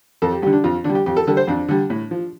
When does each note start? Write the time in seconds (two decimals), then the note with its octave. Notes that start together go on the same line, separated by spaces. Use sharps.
0.22 F2 A4
0.32 G4
0.42 D3 G3 G4
0.53 D4
0.64 F2 F4
0.84 D3 G3 D4
0.95 G4
1.06 F2 G4
1.17 A4
1.27 D3 G3 A4
1.37 C5
1.47 F2 D4
1.68 D3 G3
1.90 A2
2.11 F3